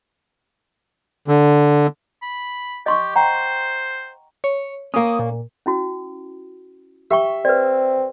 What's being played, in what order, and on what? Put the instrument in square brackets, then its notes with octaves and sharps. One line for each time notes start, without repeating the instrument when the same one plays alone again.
[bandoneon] D3
[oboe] B5
[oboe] G4 [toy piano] D#5 C6 C#6
[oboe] C5 [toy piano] F#5 G5 A#5
[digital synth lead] C#5
[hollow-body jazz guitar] A#3 C#4 [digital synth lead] D#6
[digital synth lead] A#2
[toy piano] C#4 E4 F#4
[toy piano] G4 G5 C#6 [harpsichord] E5
[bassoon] C4 [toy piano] B4 D5